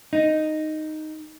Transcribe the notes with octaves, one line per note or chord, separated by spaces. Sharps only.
D#4